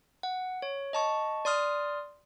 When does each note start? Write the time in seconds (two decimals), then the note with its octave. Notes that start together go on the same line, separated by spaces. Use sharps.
0.23 F#5
0.62 C#5
0.93 D#5 A5 C#6
1.45 D5 C6 D#6 F6